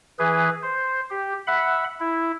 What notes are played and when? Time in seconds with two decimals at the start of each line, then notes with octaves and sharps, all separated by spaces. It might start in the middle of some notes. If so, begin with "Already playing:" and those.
0.19 E3 G#4 B4
0.62 C5
1.10 G4
1.47 E5 F#5 B5
2.00 E4